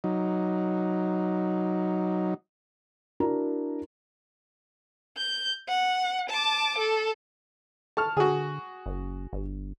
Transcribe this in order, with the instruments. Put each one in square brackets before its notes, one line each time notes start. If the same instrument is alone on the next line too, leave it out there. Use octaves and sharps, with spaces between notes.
[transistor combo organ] F#3 D#4
[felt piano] D4 E4 F#4 A#4 A#5
[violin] G6
F#5
A5 D6
A4
[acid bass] A4 [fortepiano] A5 C#6 F6
[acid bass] D3 [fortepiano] F#4 G#4
[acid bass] F#1
G1